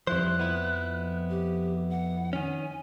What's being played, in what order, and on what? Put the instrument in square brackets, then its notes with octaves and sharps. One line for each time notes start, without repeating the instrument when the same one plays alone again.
[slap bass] F2 F3 [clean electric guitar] G3 E4 C5 [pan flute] F#6
[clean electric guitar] B3 E4
[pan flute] G4
F#5
[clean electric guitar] D#3 C#4 [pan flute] G#5